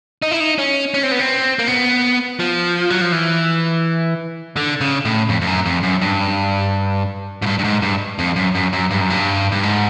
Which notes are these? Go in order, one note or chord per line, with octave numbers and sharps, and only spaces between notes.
D#4
E4
D#4
C#4
C#4
C4
B3
C4
A#3
B3
F3
F#3
F3
E3
D3
C#3
A2
F2
F2
F#2
F2
F#2
G2
G#2
G2
G2
G#2
G2
F2
F#2
F#2
F#2
G2
F#2
G2
G2
G#2